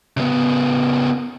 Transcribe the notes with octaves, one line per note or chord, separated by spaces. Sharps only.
C#3 B3